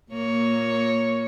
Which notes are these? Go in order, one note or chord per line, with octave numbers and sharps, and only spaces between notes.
A#2 A#3 C#5